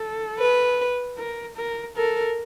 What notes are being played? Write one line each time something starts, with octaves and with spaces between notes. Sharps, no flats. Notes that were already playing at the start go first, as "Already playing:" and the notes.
Already playing: A4
B4
A#4
A#4
A4 A#4